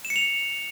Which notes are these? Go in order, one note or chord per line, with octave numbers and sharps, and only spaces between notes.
E7
C#7
F7